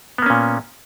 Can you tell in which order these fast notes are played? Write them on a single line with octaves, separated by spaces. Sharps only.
B3 A#3 C#4 A#2